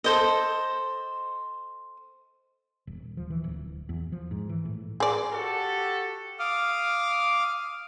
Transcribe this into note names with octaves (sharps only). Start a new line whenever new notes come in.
A4 C5 D#5
D#1
F3
E3
D1
E2
F3
G#2
E3
A2
G#4 D5
F#4 G4 A4
F5 D6 D#6 F6